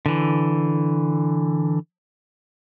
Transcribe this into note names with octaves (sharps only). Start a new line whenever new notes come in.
D3 E3